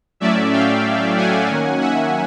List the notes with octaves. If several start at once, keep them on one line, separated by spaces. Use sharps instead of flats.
A2 F#3 A3 C#4 D5 E5
F5 G5
F#5 G#5
D#3 F#3 A#3 C#4
E5 F#5